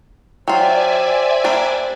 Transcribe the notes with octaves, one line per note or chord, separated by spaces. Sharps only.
F#3 F4 C5 D5 E5 G5 G#5
G3 A#3 D4